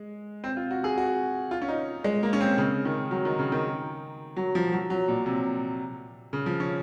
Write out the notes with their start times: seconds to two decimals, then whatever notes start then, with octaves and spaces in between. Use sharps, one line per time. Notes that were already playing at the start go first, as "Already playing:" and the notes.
Already playing: G#3
0.44 C4
0.57 F4
0.71 F#4
0.84 G#4
0.98 F#4
1.51 F4
1.62 C#4
1.68 D#4
2.04 G#3
2.23 A#3
2.33 C#4
2.41 C4
2.58 C#3
2.85 D#3
3.11 F#3
3.25 D#3
3.39 C#3
3.52 D#3
4.37 F#3
4.55 F3
4.72 F#3
4.90 F#3
5.08 A#2
5.26 C3
6.33 C#3
6.46 F3
6.60 C#4